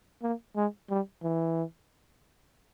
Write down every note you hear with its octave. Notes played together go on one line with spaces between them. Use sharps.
A#3
G#3
G3
E3